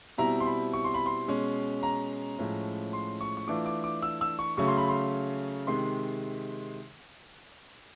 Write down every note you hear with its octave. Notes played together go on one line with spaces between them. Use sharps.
B2 G3 C4 E4 A#5
C6
B5
C#6
C6
B5
C6
B2 G#3 C#4
A#5
A2 F3 G#3 C#4
C6
C#6
C#6
E3 A3 D4 F4 D6
D6
D6
E6
E6
C#6
C#3 F#3 A3 C#4 C#6
C6
B5
C6
C3 D#3 G#3 C6